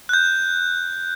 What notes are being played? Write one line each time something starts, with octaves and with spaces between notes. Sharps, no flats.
F#6 G6